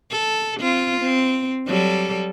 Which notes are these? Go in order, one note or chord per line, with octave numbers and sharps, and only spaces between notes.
A4
C4 F4
C4
F#3 G3 A4